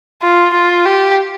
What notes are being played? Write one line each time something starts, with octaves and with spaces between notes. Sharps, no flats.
F4
F4
G4